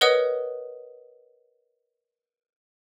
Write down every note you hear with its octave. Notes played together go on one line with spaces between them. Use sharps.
A#4 B4 C#5 D#5 F#5 D#6